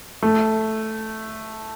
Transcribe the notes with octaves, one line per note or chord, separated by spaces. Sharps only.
A3